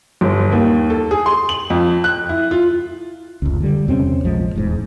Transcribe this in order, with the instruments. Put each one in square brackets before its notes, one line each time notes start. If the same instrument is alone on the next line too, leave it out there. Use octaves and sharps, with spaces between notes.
[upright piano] G1
D#2
A4
G#4
C6
F#7
F2
F#6
E4
F4
[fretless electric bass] F1 C#2
D3 G3
E2 C3 C4 C#4
A#1 F3 G#3
D#1 E2 G#2